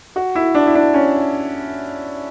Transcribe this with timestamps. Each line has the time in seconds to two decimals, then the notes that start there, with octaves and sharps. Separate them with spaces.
0.16 F#4
0.35 E4
0.55 D4
0.67 E4
0.75 D4
0.94 C#4